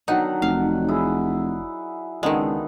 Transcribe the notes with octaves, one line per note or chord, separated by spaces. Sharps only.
D3 D#3 F#3 D#4 F#5
F1 F5
E4 G#4
C#2 D3 D#3 G#3 B3 D#4